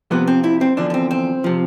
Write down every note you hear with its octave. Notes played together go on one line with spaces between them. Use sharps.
F2 C3 F3 B3
C4
E4
C4
E2 D3 F3 D4
D4
C4
C4
C3 F3